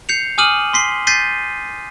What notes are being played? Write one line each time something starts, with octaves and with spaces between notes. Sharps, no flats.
G6 C7 C#7 F7
G#5 D6 D#6 F6 D#7 F#7
C6 B6 C7 G7
G6 A6 B6 C7 D#7 G7